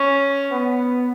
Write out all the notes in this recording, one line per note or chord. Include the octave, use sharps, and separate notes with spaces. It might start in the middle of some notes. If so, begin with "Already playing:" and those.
Already playing: C#4
B3